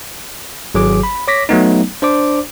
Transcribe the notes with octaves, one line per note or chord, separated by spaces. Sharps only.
G#1 F#3 G#4 D6
B5
C#5 D6 A#6 B6
F#3 A3 B3 D#4
D4 C5 D5 D6